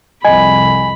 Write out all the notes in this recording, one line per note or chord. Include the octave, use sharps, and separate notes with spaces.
C2 F2 D#5 G#5 B5